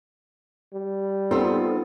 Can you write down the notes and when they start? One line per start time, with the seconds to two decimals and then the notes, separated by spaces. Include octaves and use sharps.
0.74 G3
1.31 B3 C4 D#4 F4 A4